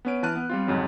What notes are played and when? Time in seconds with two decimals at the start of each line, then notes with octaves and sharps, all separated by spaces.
0.05 B3 C#4 D7
0.23 E3 A5 F6 F#6 D#7
0.36 B3
0.49 G3 C4 F4
0.67 F2 G#2 C#3 F#3 C#4